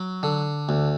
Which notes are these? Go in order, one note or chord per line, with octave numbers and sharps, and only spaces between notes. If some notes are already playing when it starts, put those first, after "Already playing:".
Already playing: F#3
D3
D2